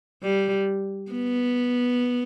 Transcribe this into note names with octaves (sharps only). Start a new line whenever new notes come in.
G3
B3